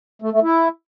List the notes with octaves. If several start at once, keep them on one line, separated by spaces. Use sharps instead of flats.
A3
A3
E4